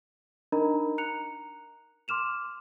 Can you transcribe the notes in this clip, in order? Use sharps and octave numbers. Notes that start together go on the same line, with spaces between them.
D4 D#4 A#4 D#5 A#5 B5
A#5 F#6 C#7 F7
C6 D6 F6 E7 F7